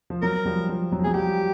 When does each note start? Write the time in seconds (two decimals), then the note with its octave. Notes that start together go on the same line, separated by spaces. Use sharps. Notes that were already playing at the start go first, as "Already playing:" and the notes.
0.10 F3
0.22 F#3 A#4
0.45 F3 G3
0.69 F3
0.92 F#3
0.99 F3
1.04 F#3 G#4
1.14 F3 G3 G4